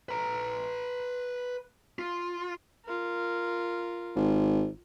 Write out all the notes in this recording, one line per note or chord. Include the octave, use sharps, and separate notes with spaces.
B4 A#5
F4
F4 A#4
G#1